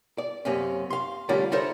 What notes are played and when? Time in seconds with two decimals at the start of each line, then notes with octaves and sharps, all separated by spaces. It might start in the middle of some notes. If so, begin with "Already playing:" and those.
0.18 D5
0.45 F#2 C3 A#3 C#4
0.90 F5 C6
1.29 D3 G3 A3 C#4 F4 A#4
1.52 E4 F4 A4 A#4 C5 C#5